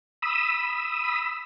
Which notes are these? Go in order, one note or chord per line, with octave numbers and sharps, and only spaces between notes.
B5 D#6 E6